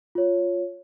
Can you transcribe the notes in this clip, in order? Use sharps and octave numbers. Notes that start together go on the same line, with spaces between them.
F4 C#5